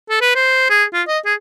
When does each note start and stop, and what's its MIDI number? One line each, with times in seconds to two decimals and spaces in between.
0.10 0.21 69
0.21 0.30 71
0.35 0.67 72
0.70 0.84 68
0.93 1.02 65
1.07 1.19 75
1.25 1.34 68